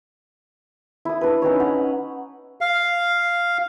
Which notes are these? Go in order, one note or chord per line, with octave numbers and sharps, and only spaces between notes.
E4 D#6
D4 B4
C#4 D#4 B4 C#5
F#5
F5